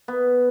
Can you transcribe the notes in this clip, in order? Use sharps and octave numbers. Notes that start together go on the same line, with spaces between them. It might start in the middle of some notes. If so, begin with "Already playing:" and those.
B3